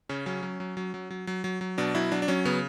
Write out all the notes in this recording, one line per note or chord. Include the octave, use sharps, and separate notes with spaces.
C#3 C#4
F#3 C#4
F#3
F#3
F#3
F#3
F#3
F#3
F#3
F#3
B2 D4
F#3 E4
F#3 D4
D4
F#3 C#4
C#3 B3